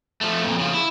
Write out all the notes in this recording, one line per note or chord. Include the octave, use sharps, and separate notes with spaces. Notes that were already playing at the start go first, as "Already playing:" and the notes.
F3 A3
F2 A#2
C#3 F3
E4